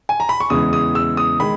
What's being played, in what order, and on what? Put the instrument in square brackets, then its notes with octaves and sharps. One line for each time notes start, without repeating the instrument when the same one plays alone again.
[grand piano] G#5
A#5
B5
C#6
E2 C#3 E3 G#3 D#6
D#6
E6
D#6
D#3 G#3 B5